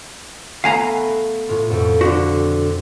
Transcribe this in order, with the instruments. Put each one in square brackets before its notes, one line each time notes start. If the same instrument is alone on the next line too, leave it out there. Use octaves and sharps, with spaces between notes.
[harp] A3 B3 B4 [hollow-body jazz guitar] F5 G#5 A#5
[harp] A2 F4
F2 B2
[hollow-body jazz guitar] D3 F#4